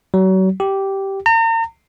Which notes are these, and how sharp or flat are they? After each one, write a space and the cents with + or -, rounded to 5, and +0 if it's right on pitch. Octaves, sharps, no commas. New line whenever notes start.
F#3 +35
G4 -10
A#5 -40